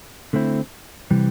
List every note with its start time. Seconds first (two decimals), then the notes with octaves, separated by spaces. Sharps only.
0.33 D3 A3 C4 E4
1.11 C3 E3 G3